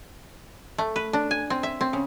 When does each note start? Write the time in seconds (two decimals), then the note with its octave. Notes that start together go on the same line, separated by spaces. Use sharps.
0.78 A3
0.96 B4
1.13 D4
1.31 G#5
1.50 C4
1.63 E5
1.81 C4
1.93 C#3